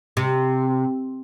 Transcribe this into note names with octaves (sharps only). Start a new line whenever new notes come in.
C3